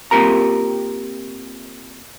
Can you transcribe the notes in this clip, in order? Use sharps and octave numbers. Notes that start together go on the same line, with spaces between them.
A#3 C4 F4 G4 A#4 A#5